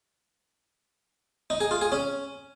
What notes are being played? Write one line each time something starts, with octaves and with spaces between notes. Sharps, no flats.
D#4
G#4
F4
G#4
C#4